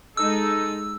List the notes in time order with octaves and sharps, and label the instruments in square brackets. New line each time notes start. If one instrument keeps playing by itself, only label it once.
[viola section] G#3 D#4 A4 [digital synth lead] E6